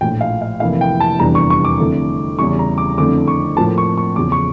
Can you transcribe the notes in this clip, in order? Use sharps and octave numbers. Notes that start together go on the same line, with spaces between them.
A#1 A2 F3 G5
F5
F5
F1 F2 E3 A#3 E4 F5
G5
A5
F1 E2 E3 G3 D4 A#5
C#6
C#6
D6
F2 D3 A3 E4
E2 C#3 G3 C#4 E4 C#6
A#5
D6
F2 D3 A3 E4 D6
C#6
A2 F3 A#3 A5
C#6
C#6
E2 C#3 F3 D6
C#6